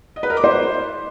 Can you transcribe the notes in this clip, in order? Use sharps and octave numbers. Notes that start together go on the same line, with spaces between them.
D#5
B4
A#4
D6
C5